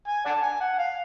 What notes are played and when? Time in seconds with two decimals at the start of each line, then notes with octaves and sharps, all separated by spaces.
0.07 G#5
0.26 D5 F#5 A5
0.42 G#5
0.60 F#5
0.78 F5